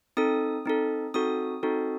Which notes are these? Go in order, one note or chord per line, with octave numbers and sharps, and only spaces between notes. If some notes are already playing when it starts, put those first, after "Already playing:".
C4 D#4 A4 D#6
C4 D#4 A4
C4 D#4 F#4 A4 D#6
C4 D#4 F#4 A4